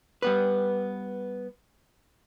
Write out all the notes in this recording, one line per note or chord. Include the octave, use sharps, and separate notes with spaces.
G3 B3 B4